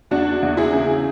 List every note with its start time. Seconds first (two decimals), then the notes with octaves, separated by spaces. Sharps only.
0.11 E2 D4 F#4
0.43 E2
0.57 E4 G#4
0.73 C#3